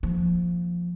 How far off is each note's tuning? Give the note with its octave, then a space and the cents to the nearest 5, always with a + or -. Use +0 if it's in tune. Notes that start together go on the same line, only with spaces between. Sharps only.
F3 +0 A#3 +0